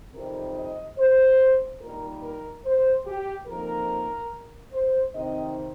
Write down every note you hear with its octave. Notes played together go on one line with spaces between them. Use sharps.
F2 C3 G3 C4 D#4 A#4
D#5
C5
A#2 G3 D#4 A#4
A#4
C5
G4
F2 F3 A#3 D#4 A#4
C5
C3 D#3 C4 D#4 D#5